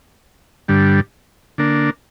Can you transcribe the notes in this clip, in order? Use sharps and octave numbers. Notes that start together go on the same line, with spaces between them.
G2 D3 G3
D3 A#3 D4